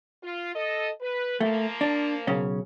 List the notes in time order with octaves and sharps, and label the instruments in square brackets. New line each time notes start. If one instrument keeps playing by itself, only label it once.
[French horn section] F4
A4 D#5
B4
[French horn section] F3 A#3 [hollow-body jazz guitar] A3
[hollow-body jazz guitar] D4
B1 C#3 C#4